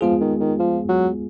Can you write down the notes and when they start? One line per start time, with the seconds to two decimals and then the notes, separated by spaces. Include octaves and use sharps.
0.01 F3 G#3 B3 F4 G#4
0.21 D#3
0.40 D#3
0.59 F3
0.89 F#3